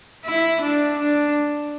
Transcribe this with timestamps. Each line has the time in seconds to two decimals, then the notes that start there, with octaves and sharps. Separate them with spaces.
0.25 E4
0.61 D4
0.99 D4